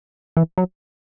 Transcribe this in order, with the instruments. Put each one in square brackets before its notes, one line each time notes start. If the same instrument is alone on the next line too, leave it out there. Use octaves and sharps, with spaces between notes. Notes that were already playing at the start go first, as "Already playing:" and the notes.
[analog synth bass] E3
F#3